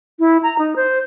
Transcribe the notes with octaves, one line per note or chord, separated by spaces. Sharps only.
E4
A#5
D#4
C5